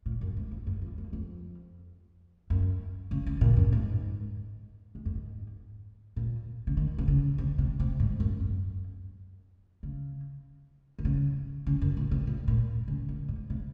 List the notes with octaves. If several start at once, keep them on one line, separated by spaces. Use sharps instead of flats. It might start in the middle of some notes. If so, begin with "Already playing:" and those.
A#2
F#2
G#2
F2
F#2
F2
F#2
F2
F#2
C#3
C#3
A#2
F#2
G#2
G#2
F#2
G#2
A#2
C#3
D#3
C3
C#3
C3
C3
C3
G#2
F#2
F#2
C#3
D#3
C#3
C#3
F#2
A#2
C3
A#2
A#2
C#3
A#2
G#2
C3